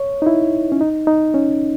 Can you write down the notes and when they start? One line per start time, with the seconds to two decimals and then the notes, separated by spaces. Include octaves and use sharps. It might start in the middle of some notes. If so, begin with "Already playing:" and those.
Already playing: C#5
0.22 D#4
0.27 E4
0.72 C#4
0.81 D#4
1.07 D#4
1.34 C#4